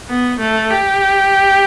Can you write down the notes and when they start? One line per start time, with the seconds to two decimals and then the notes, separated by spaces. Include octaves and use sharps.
0.09 B3
0.40 A3
0.71 G4